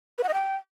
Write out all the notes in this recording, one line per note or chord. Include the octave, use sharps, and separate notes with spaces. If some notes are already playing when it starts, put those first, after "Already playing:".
B4
F#5
D#5
G5